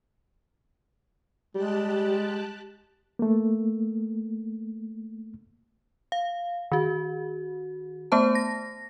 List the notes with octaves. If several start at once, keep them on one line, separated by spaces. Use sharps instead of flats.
G3 G#3 G4 A5 F#6
A3 A#3
F5
D#3 F#4
A3 B3 C5 A5
A#6